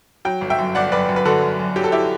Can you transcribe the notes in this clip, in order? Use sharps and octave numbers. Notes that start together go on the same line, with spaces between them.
F#3 G5
G1
E5 G5
F#2
G1 D5 F#5
F#2 B4 D5
F#2
B4
D3 F#4 A4
F#2
F#2
F#3 G4
A4
E4 G4